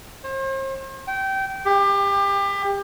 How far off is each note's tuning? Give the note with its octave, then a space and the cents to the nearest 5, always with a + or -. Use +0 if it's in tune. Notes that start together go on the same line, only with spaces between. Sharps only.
C5 +40
G5 -20
G4 +30